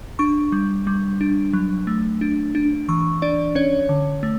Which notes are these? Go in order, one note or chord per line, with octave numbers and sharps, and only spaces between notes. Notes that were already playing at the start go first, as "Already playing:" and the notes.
D4 C#6
G3
G3
D4
F#3
A3
D4
D4
E3 C#6
D4 D5
C#4 C#5
D3
A3